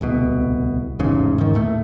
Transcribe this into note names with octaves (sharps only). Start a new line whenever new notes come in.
D1 C2 B2
E1 A1 G#2 C#3
G#2 D#3
D#2 A2 A3